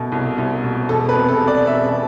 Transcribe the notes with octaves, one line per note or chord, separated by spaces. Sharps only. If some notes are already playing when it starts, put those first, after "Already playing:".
Already playing: C2 B2 A3
C2
C2
B2
E1 A4
B4
C3
A4
C3
D5
E1 E5